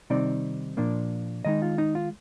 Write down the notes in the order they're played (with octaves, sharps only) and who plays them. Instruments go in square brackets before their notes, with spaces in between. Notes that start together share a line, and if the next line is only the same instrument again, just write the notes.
[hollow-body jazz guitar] C3 D#3 G3 C4 D#4 D5
A#2 F3 A#3 D4
D#3 G#3 D#4 D#5
F4
D#4
F4